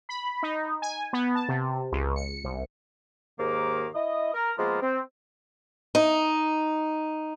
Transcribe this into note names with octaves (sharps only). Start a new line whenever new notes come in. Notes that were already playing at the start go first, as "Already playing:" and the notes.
B5
D#4
G#5
B3
A5
C3
C#2
C#7
C2
D#2 G#2 D#3 A#3 D6
E4 D#5
A#4
F3 G#3 A#3 B3 F4
C4
D#4